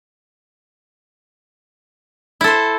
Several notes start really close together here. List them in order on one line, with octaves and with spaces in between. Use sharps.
E4 A4 C5